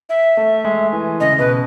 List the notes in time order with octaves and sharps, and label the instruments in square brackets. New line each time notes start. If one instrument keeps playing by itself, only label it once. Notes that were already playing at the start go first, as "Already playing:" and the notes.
[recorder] E5
[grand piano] A3
G#3
E3
[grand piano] C#3 [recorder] D#5
[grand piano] C#3
[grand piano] B2 [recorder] B4